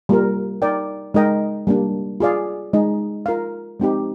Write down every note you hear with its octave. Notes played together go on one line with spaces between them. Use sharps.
G3 A#3 F4 A#4
D#4 A#4 D5 G5
G#3 D#4 A#4 D#5 G5
G3 A#3 D4
F4 G#4 D5 F5
G#3 D#4 G#4 D#5
F4 A#4 F5
G#3 C4 D#4 G4